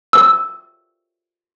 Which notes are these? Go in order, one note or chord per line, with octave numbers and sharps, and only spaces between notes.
E6